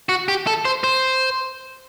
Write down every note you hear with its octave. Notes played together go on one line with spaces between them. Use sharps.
F#4
G4
A4
C5
C5